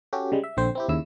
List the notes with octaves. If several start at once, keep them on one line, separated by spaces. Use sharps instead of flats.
C#4 F#4 G4 A4
C#3 G3 G#3
E5
A#1 D3 C4 C5
C4 E4 G4
D#2 C#3 E4 E6